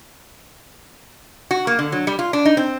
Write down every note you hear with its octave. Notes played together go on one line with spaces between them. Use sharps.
F#4
A#3
D3
F#3
G3
F4
D4
D#4
C4